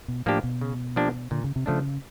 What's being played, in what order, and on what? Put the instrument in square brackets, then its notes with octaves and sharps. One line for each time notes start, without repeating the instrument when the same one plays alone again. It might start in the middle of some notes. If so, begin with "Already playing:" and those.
[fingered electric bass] B2
[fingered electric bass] A2 [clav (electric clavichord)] F3 A#3 D4 G4
[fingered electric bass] B2
[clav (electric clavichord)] C#3
F3 A#3 D4 G4
[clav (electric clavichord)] A#2 [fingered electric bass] D3
[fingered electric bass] C#3
C3
[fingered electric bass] C#3 [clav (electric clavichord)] F3 A3 D4